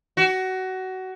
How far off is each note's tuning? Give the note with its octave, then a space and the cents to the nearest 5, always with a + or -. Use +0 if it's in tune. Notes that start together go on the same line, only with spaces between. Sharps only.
F#4 +20